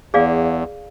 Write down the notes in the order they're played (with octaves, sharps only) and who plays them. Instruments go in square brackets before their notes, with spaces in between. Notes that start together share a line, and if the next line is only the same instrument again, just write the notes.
[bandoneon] E2 [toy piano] G#4 D5 F5